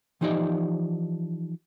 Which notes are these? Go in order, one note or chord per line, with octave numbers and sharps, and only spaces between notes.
E3 F3 D#4 G4 D5 D#5